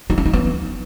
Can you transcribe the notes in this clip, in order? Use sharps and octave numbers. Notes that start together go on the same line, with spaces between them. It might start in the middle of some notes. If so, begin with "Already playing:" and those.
D#4
D4
D#4
B3